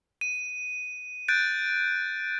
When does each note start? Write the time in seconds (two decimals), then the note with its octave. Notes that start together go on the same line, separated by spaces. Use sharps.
0.21 D#7
1.28 F#6 G6 A6 D7